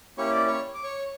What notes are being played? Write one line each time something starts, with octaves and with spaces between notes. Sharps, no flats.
A#3 C#4 E4 G4 C#5 C#6
D5 D6
C#5 C#6
D6
C#5 C#6